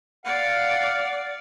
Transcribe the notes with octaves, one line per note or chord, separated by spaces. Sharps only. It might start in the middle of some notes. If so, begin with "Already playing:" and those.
D5 F5 F#5